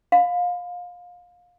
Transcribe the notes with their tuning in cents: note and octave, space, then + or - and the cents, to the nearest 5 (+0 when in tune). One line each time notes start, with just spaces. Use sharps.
F5 +25 B5 +35